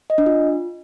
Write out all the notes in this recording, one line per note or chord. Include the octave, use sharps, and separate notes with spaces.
D#5
D4
F4